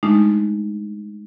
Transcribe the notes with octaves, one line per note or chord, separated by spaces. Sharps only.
G#3 A3 D4 D#4 F4